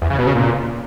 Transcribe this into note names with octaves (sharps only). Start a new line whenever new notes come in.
E2
C#3
B2
C#3
A#2